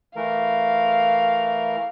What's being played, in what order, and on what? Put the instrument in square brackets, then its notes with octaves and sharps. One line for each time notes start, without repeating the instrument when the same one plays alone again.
[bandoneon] E3 A3 A#4 [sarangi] F5